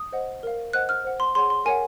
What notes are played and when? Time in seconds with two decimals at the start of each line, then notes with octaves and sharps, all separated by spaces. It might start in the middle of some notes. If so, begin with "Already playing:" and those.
Already playing: D#6
0.12 C5 D#5 F#5
0.43 A#4 F5
0.73 C5 D#5 F#5 F#6
0.89 F6
1.04 C5 F#5
1.20 C6
1.35 G#4 C#5 F#5 C6
1.50 C6
1.65 A#4 C#5 F#5 G#5